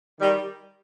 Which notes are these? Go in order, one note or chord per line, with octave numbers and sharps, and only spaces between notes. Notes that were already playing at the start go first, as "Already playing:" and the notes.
D#3 G3